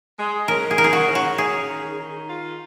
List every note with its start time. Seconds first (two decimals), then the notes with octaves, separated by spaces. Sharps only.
0.18 G#3
0.47 C#4 A#4
0.71 G#4
0.78 D#3 A#4
0.84 G#4
0.93 F#4
1.08 C#4
1.15 F#4
1.38 C#4 G#4
1.68 D#3
1.98 D#3
2.28 F4